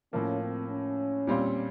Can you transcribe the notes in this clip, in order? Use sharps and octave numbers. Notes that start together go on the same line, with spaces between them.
A2 F3 A#3 C#4
C4
C#4
A#2 G3 C4 F4